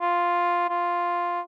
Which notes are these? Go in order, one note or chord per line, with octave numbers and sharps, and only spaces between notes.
F4
F4